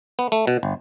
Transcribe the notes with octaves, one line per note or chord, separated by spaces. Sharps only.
B3
A3
B2
G1